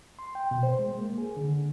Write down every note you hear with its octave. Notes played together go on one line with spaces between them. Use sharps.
C6
G5
B2
C5
G#3
A#3
G#4
D3